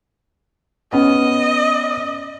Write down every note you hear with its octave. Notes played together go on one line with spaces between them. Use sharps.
B3 C#4 D#5